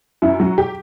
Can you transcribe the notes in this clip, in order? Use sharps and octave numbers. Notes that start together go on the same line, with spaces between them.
F#2 E4
F#3 F#4
G4